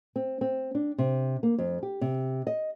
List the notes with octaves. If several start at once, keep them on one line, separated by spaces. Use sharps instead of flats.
C4
C4
D4
C3
A#3
F2
G4
C3
D#5